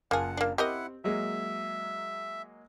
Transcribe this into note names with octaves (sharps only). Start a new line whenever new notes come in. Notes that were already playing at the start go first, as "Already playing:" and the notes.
F#1 A#3 F4 G#4 F#5 A5
A#3 D4
C4 E4 G4 A#4 D#5 F#5
F#3 G#3 A#3 E5